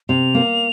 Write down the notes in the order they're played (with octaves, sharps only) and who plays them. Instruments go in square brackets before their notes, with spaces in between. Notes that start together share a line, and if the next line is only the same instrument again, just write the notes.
[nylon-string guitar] C3 [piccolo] F7
[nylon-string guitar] A#3